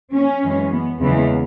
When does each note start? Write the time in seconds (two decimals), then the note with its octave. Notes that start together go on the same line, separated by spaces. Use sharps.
0.14 C#4
0.43 F#2 E3 G#3
0.71 B3
1.00 E2 C#3 E3 G#3 B3